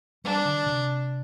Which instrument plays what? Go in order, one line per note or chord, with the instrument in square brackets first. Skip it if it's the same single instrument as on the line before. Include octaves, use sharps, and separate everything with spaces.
[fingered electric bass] G3 [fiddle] D4
[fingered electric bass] D3
C3